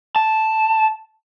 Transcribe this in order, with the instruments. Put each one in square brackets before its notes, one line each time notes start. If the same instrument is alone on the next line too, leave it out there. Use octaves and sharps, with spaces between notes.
[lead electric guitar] A5